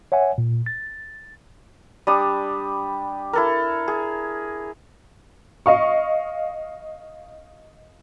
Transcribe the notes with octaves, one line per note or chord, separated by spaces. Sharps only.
C#5 E5 F#5 G#5
A#2
A6
G3 D4 D#6
E4 A4 A#4
G#4
D#5 F5 C#6